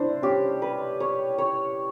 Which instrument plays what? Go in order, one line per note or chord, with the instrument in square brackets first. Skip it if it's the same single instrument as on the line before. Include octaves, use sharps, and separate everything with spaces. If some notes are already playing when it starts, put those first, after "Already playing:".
Already playing: [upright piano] D4 E4 [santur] C5
[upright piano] C#4 [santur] G4
[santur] B4
C#5
C#5